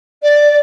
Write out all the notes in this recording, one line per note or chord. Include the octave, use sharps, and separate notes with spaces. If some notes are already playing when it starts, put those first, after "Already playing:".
D5